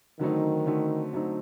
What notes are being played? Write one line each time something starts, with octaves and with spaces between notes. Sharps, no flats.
D3 D#3 F#3 A3 C4 D#4
D3 F#3 A3 C4 D#4
D3 F#3 A3 C4 D#4